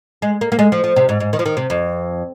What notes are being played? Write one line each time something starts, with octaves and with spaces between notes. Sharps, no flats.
G#3
A#3
A#3
G#3
F3
F3
C3
G#2
G#2
D#3
F3
D#3
C3
F2